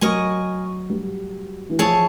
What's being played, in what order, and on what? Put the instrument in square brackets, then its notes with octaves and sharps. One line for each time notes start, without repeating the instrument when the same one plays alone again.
[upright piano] F#3 [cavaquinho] A#4 D#5 G#5 C#6
[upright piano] G3
E3
[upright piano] F3 [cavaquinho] G#4 C#5 E5 A5